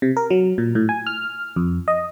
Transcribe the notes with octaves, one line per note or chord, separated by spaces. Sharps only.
C3
A#4
F#3
A#2
A2
G#5
F6
F2
D#5